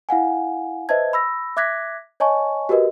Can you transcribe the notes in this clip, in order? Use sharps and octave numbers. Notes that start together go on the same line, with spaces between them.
E4 F5 F#5 G#5
B4 C5 D#5 E5 A5 G#6
B5 E6 A#6
E5 D6 F#6 G#6 A#6 B6
C#5 D#5 G#5 A5 C#6
F#4 G4 A#4 B4 D#5